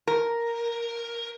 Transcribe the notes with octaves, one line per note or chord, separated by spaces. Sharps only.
A#4